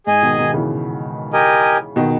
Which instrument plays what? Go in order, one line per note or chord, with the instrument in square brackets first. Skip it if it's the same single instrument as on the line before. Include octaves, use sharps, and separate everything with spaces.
[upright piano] G#2 [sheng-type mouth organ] G#4 D#5 G#5
[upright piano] B2 D#3
B2 D#3
C#3 E3
[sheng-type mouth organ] G4 A#4 D#5 G#5
[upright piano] B2 D#3